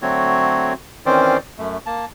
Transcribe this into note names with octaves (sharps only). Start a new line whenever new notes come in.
D3 F#3 A3 C4 F#4 C#5
D#3 E3 C4 C#4 C5 D5
F#2 A3
A#3 A5